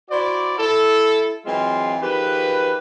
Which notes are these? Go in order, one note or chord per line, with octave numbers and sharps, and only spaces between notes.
E4 F#4 C5 D5
E4 A4
E3 F#3 G#3 C4 F4
D#3 F3 G4 G#4 B4